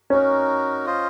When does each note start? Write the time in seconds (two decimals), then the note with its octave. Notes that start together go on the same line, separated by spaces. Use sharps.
0.10 C#4 D#4 F#4 A#4
0.86 F4 C5 D#5